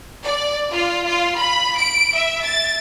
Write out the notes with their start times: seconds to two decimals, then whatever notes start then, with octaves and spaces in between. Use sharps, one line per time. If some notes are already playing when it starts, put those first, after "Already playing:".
0.25 D5
0.71 F4
1.06 F4
1.36 B5
1.78 D7
2.15 E5
2.45 A6